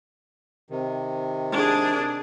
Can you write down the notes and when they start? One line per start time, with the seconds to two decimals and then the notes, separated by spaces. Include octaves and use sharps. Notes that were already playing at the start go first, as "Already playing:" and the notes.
0.70 C3 D#3
1.52 D4 G#4